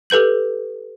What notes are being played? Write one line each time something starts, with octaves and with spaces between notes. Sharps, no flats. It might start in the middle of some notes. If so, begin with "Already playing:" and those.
G4 A4 B4 G6 F#7